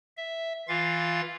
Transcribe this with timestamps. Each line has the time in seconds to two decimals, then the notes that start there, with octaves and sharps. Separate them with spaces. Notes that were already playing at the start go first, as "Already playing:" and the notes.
0.17 E5
0.68 E3 F4 F5 A6